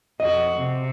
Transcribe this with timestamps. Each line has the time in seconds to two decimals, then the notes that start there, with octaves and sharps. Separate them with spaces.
0.20 F2 F#4 D#5
0.57 C3